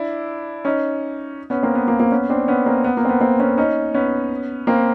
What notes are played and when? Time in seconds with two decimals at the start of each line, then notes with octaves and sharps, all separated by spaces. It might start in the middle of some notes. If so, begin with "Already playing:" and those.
Already playing: D4 E4
0.65 C#4 D#4
1.50 B3 C#4
1.63 A#3 C4
1.75 B3
1.88 A#3
1.99 A#3 C4
2.11 B3 C#4
2.30 C4 D4
2.48 B3 C#4
2.66 A#3 C4
2.84 B3
2.97 A#3
3.05 C4
3.09 B3
3.21 A#3 C4
3.40 B3 C#4
3.58 C#4 D#4
3.94 B3 C#4
4.67 A#3 C4